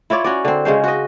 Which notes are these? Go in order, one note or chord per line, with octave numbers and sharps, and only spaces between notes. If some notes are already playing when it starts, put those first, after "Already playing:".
E4 F4 C#5 D5
C#4 F#4 D5
D3 C4
C#3 G#3 C#4 C5
F#4 D#5